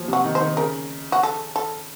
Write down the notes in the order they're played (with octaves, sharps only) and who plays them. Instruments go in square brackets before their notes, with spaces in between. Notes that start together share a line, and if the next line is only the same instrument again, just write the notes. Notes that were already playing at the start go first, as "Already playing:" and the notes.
Already playing: [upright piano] F3 F#3 A#3
[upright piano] C3 [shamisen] F#4
[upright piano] D#3
[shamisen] C5
[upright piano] D#3
[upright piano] C#3 [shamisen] A#4
[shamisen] F#4
A4
A4